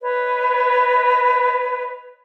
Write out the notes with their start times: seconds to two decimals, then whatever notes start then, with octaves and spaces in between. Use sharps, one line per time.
0.01 B4 C#5 D#5